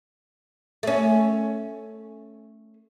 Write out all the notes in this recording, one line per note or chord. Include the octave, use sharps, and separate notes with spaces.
A3 C#4